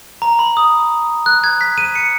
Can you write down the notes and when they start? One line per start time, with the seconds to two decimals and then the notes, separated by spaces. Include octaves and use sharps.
0.22 A#5
0.39 B5
0.57 D#6
1.26 F#6
1.44 G#6
1.61 B6
1.78 D#7
1.95 C#7